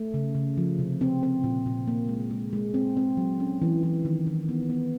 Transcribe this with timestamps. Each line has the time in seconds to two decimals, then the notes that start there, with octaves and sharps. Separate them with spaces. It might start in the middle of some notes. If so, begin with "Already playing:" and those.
Already playing: A3
0.14 C#3
0.35 C#3
0.58 F3
0.79 C3
1.01 C4
1.23 C4
1.44 A#2
1.66 A#2
1.88 A#3
2.09 G#3
2.31 G#3
2.53 G#3
2.74 C4
2.97 C4
3.17 F#3
3.40 C#4
3.62 E3
3.83 E3
4.05 D#3
4.27 D#3
4.49 B3
4.69 B3